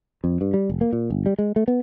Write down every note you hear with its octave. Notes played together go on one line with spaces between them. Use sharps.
F2
G2
G3
F1
A#3
A#2
G1
G3
G#3
A3
B3